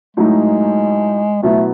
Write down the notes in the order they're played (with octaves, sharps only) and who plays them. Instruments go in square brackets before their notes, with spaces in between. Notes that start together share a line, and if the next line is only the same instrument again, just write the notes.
[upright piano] A2 F#3 A3 D#4 [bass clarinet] G#3
[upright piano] B2 F#3 B3 E4 [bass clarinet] A3